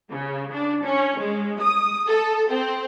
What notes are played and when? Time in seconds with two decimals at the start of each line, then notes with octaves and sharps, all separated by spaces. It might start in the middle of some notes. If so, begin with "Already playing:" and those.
0.11 C#3
0.53 D4
0.84 C#4
1.19 G#3
1.60 D#6
2.08 A4
2.51 C4